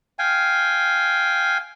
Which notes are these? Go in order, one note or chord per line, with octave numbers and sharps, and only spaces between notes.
F5 G5 G#5